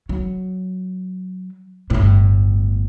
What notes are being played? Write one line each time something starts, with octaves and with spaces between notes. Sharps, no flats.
F#3
G1 A2